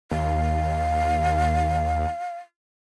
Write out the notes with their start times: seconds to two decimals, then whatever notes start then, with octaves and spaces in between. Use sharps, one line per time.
0.11 D#2 F5